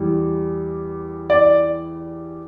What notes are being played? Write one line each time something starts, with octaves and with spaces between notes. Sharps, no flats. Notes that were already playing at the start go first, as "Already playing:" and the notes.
Already playing: E2 E3 G3
D5